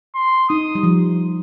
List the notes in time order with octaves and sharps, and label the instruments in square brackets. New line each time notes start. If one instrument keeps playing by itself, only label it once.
[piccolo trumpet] C6
[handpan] D#4 [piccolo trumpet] D#6
[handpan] G3
F3